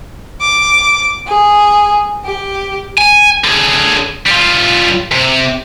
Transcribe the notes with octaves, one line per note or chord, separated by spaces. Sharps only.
D6
G#4
G4
G#5
D3 G#4
G3 F4
C3